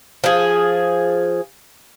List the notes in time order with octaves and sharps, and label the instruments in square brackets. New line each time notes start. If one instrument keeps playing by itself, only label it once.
[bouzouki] F3 G#4